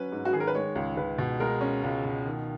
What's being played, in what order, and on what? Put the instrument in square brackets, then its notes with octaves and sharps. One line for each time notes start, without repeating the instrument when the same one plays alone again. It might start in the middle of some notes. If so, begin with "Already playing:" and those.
Already playing: [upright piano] F#3 C#4 [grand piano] B4
[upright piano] G#2
[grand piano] F#4
[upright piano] D#3 [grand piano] G#4
[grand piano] A#4
B4
[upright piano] G#3 [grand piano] C#5
[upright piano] C#2
[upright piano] C#2 [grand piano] B4
[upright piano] B2
[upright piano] G#3 [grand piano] A#4
[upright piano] C#4
C#2
B2
D#3